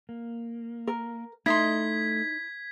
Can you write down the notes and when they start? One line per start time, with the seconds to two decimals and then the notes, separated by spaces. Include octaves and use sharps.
0.09 A#3
0.87 A#4
1.46 A3 D#4 E4 D#5 C6 G#6 B6